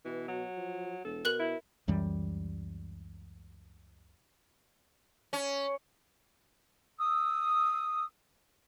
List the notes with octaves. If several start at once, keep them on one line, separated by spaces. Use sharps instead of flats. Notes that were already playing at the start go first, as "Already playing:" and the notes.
B2 E3
F#3
F3
E1 A4
B2 A#4 F#6 F#7
E4
C#2 F#2 E3 G3
C#4
D#6 E6